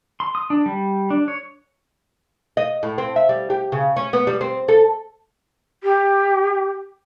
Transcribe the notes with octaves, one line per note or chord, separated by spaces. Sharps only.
C6
D#6
D4
G3
D4
C#5
D#5
A2
C4
E5
G3
G4
C#3
C#4
B3
G3
C4
A4
G4